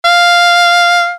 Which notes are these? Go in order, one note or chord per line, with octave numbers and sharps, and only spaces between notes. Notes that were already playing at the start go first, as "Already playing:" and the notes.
F5